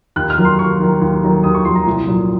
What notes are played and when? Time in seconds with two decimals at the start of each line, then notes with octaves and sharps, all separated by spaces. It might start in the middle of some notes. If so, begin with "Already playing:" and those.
0.16 D#2 F#6
0.30 F6
0.38 D#3 F#3
0.45 C6
0.59 D#2 C#6
0.80 D#3 F#3
1.02 D#2
1.23 D#3 F#3
1.43 D#2 D#6
1.55 C#6
1.65 D#3 F#3 C6
1.76 A#5
1.87 C2
2.07 A#2 F#3